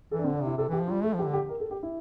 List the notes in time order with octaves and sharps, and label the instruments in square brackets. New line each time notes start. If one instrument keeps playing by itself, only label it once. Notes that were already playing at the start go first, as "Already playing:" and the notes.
[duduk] E3 [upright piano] A4
[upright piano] D4
C4
[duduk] D3
[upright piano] D4
[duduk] C3 [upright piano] E4
[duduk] C3 [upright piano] A4
[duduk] E3 [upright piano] G4
[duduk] F3
[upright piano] F4
[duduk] G3
[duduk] A3 [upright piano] A4
[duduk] F3 [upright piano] G4
[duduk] D3
[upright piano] G4
A#4
A4
G4
E4